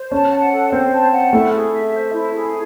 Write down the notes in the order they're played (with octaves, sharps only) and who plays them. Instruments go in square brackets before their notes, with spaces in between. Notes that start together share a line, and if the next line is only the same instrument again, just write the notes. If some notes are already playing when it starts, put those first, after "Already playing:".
Already playing: [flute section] C5
[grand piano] C#4 [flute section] A5
[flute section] F#5
A4
[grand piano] C4 [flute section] C5
[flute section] A5
F#5
[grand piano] A3 [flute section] E4
[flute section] G#4
E5
C5
E4
G#4